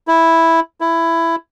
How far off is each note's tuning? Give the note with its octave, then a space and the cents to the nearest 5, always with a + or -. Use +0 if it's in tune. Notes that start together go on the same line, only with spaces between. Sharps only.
E4 -5
E4 +10